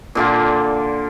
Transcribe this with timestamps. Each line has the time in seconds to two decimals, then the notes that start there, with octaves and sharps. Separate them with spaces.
0.15 A#2 D3 F4